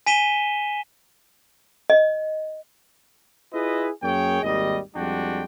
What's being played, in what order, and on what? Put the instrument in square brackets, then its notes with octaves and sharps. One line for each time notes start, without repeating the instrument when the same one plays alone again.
[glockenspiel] G#5 B6 D#7 E7 G7
[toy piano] D#5
[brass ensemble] E4 F4 G#4 B4 D#5 E5
F#2 A#3 G#4 C#5 G5
G#1 D#2 G3 D#5
F2 G3 G#3 D4 F#4 G5